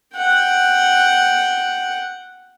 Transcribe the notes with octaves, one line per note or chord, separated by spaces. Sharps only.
F#5 G5